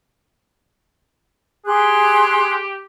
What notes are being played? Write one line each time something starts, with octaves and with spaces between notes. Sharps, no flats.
G4 G#4 C6 F#6